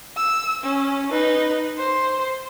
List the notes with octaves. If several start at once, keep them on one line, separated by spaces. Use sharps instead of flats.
E6
C#4
D#4 B4
C5